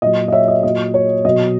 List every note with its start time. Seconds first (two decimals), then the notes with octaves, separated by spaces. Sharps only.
0.02 A#2 F#3 D#5
0.28 D#5
0.32 C#5 E5
0.48 D#5
0.63 A#2 F#3 D#5
0.94 C#5
1.25 B2 F#3 D#5